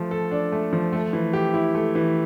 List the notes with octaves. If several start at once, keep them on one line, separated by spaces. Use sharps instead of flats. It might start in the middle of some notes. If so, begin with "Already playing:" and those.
Already playing: F3 A3
A4
D4
A3
F3
A3
E3
G4
E4
A3
E3